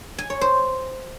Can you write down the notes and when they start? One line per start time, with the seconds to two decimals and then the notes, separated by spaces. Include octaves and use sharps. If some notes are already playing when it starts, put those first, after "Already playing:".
0.18 G#5
0.30 C#5
0.41 C5